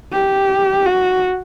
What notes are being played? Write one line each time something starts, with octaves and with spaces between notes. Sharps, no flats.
G4
F#4